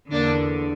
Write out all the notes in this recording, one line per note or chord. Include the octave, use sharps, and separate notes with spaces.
E2 D3 A#3 D4